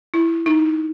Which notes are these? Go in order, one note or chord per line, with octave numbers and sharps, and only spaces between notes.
E4
D#4